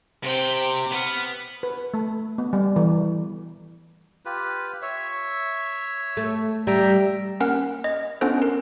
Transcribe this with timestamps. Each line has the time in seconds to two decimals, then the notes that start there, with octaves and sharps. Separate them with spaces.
0.23 C3 C4 G5
0.92 B3 F#5 F6
1.63 B4
1.94 A3
2.38 B3
2.53 G3
2.76 E3
4.25 F4 G4 B4
4.82 C#5 E5
6.17 A3
6.67 G3 E5 G5 A#5
7.40 A#3 C#4 A#4 F#5 F6
7.84 D#5
8.21 B3 C#4 D4 F4 A4 C5
8.38 C#4 A#4